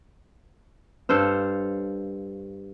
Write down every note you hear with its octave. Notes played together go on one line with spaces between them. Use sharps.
G2 A4 C5 F5